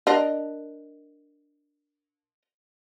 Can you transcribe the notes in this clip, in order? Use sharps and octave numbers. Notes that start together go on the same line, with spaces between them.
D4 A#4 D#5